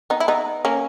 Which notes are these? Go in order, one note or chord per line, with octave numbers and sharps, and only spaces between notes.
B3 D#4
E4
B3 D#4
A#3 C#4